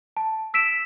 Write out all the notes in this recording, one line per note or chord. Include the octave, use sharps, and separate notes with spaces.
A5
E6 B6 D7 E7